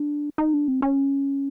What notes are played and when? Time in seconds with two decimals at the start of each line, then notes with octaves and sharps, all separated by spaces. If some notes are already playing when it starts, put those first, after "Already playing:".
Already playing: D4
0.38 D#4
0.53 D4
0.68 C4
0.82 C#4